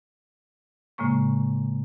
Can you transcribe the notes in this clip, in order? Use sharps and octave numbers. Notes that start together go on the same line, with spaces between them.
A2 C#3 G#3 A#3 C#6